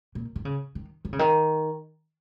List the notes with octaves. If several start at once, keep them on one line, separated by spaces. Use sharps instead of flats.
A#2
D#3
C#3
D#3
D#3
C#3
D#3